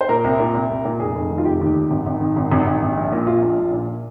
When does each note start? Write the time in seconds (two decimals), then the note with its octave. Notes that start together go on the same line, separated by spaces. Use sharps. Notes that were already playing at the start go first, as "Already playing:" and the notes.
0.01 C5
0.09 A#2 A#4
0.24 C2
0.39 A#2
0.55 C2
0.70 C2
0.85 A#2
1.00 F1 G#4
1.15 F1
1.31 D#3
1.38 F4
1.45 F1 G4
1.61 D#2
1.76 D#3
1.91 G#1
2.06 G#1
2.21 D#3
2.36 G#1
2.52 G#1
2.67 G#1
2.82 A#1
2.97 A#1
3.12 A#2
3.27 A#1 F4
3.42 A#1
3.58 A#1
3.73 A#2